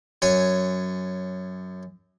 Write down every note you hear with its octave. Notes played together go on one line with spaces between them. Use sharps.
F#2 C#5 G#5